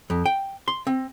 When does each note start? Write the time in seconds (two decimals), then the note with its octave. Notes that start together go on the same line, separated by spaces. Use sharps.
0.10 F2
0.26 G5
0.68 C6
0.87 C4